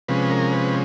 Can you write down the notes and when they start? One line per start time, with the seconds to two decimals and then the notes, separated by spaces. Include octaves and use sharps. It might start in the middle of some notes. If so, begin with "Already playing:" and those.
0.08 C3 F3 G#3 C#4 B4
0.30 A#4
0.52 B4